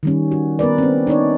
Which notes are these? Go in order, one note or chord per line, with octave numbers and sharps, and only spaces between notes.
D#3 G3 C#4
F#4
B3 A#4 B4 D5
C4 C#4
D4 D#4 C#5 D5